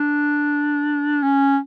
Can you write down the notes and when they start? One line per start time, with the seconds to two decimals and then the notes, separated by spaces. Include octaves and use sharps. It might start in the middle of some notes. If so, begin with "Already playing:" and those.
Already playing: D4
1.22 C#4